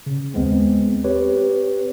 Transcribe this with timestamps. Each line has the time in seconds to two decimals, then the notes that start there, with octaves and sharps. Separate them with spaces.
0.06 C#3
0.34 D#2 G#3 B3 C4
1.04 C4 G4 B4 C#5